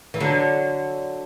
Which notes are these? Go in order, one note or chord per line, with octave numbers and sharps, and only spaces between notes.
E3
D3 F#3